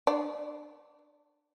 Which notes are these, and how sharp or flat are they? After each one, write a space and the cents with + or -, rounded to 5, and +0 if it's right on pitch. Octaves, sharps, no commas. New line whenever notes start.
D4 +25 D5 -25